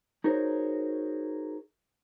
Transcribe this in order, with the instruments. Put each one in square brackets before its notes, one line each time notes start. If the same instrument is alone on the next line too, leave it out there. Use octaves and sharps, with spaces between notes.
[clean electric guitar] D#4 F#4 G#4 A#4 C5 C#5